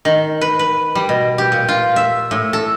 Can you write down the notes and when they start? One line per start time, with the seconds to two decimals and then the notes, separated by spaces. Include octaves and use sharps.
0.05 D#3
0.41 B4
0.59 B4
0.95 G3
1.09 B2
1.38 G4
1.52 A#2
1.68 F4
1.96 E5
2.31 A2
2.53 A4